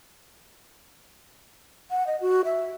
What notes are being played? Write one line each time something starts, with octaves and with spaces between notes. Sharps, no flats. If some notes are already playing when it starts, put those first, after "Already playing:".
F#5
D#5
F#4
E5